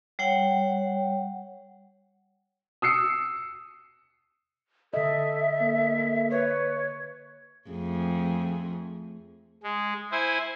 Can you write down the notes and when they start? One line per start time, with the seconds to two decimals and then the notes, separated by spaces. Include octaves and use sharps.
0.19 G3 C#5 F#5 G5
2.82 D#6 E6 C7 C#7
4.94 D3 A4 D#5 E5
5.61 A#3
6.30 B4 C#5
7.70 F2 A3 G#4
9.63 G#3
10.12 E4 C5 G#5